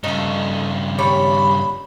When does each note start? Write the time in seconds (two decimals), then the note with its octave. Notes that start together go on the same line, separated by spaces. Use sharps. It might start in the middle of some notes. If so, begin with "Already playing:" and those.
0.04 G2 C#3 D#4 A4
0.99 G3 C#5 D5 B5